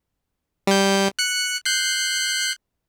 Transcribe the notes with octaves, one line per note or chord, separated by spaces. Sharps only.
G3 G6
F#6 C#7
F#6 G6 C7